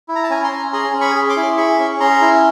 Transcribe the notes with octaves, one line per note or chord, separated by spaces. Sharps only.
E4
A#5
A5
C#4 G#5 A#5
A#5 C6
C#4
G#4 A#5 C6
C#4
B5 C#6
G#4
C6 D6
E4
G#4 B5 C#6
C#4
C#4 A#5 C6
E4